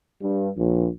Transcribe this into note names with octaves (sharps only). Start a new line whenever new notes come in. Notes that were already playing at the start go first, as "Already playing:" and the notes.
G2
A#1